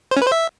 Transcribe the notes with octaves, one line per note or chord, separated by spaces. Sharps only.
C5
C#4
B4
C5
E5